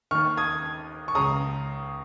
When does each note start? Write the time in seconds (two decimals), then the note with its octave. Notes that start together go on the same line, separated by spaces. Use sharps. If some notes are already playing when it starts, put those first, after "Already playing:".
0.11 D#3 C#6 F6
0.15 D#2
0.37 D#6 G#6
1.08 C#6
1.15 C#2 C#3 A#5 D#6